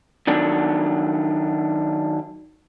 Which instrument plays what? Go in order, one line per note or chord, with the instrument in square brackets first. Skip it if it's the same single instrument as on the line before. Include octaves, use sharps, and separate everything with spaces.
[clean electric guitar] D#3 F#3 D4